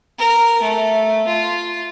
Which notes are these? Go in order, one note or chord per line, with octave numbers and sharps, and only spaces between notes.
A#4
A3
F4